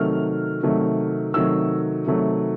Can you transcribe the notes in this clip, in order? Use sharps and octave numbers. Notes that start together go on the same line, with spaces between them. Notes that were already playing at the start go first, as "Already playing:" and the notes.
Already playing: C3 D#3 F#3 A3 F6
C3 D#3 F#3 A3
C3 D#3 F#3 A3 E6
C3 D#3 F#3 A3